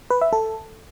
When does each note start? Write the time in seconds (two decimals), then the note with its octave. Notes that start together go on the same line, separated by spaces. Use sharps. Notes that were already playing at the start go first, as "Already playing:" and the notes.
0.11 B4
0.22 E5
0.33 A4